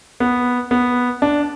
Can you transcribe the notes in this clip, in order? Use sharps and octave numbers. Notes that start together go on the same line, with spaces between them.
B3
B3
D4